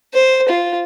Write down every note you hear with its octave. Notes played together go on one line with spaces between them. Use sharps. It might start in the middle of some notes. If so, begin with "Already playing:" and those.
C5
F4